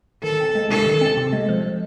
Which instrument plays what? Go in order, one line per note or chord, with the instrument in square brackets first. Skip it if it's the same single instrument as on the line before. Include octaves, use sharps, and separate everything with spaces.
[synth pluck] D#3 [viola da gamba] A4
[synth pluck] C4
G#3
[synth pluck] C3 [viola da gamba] A4
[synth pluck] D#3
C4
C3
G#3
F3